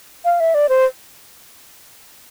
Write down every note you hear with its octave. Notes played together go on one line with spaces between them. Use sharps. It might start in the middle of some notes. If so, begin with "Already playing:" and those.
F5
E5
D5
C5